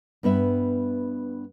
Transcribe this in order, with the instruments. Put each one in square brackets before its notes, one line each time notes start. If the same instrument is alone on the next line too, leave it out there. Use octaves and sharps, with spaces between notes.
[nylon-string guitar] G2 B3 B4 E5